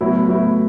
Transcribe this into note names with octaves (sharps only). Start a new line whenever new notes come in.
A2 F#3 B3 E4
A2 F#3 B3 E4